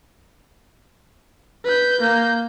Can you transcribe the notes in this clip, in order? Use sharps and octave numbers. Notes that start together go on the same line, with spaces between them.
B4 G6
A#3 G6